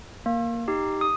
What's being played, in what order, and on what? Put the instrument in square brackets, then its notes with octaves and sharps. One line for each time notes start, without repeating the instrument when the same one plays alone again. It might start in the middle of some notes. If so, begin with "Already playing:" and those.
[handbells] A#3
D#4 G4
D#6